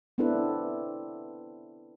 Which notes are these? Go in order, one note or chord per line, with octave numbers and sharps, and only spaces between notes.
B3 C4 D4 E4 A4 B4